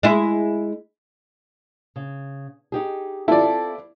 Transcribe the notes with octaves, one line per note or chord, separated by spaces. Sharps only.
G#3 E4
C#3
D#4 G4 G#4
C4 E4 F4 A4 D5